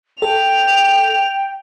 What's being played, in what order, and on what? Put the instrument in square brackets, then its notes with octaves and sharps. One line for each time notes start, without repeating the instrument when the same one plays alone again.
[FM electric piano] A4 [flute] G5 [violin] F7